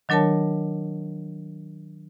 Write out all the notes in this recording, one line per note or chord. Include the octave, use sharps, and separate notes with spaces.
D#3 F#3 D4 A#4 C#5 A5